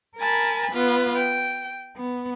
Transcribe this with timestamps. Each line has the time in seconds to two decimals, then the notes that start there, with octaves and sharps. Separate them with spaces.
0.19 A#4 G#5 A5 B5
0.72 B3 F4 B4
1.15 G5
1.96 B3